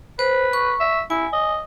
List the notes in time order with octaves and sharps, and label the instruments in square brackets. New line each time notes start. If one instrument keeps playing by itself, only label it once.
[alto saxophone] B4 [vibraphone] C5
[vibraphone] C#6
[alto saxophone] E5
[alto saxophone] E4 [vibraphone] G#5
[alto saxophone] D#5